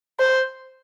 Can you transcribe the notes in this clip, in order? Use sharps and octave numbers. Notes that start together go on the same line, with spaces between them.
C5